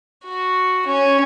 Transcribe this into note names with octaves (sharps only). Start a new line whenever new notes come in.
F#4
C#4